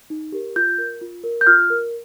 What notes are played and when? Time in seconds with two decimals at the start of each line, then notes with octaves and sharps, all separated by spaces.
0.10 D#4
0.32 G4 A#4
0.56 F4 G6
0.78 A#4
1.01 F4
1.24 A#4
1.41 G6
1.47 F4 F6
1.70 A#4